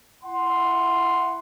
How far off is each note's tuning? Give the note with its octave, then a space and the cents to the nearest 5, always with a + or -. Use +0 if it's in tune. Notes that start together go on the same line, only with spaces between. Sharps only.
E4 +20 F#5 +0 C6 +0